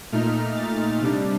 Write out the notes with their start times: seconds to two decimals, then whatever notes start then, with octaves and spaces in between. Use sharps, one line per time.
0.12 A#2 A3 D#4 F6
0.56 A6
1.01 C3 G3 D4